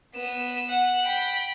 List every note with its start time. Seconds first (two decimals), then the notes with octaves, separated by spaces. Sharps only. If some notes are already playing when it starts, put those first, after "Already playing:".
0.15 B3 E7
0.69 F#5
1.04 G5 B5